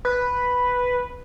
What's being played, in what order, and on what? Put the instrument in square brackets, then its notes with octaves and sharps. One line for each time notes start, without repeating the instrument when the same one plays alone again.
[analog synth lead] B4